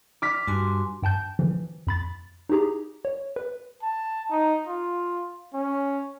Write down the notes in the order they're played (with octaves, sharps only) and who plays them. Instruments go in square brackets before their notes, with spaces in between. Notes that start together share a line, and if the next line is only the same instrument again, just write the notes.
[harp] D6 F6 B6
[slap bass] G2 [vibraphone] F#4 G#5 C6
[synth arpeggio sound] G2 G5 A5 G6
D3 E3 F3
F2 B5 A6
D#4 E4 G4 G#4 A#5
C#5
B4
[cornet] A5
D#4
F4
C#4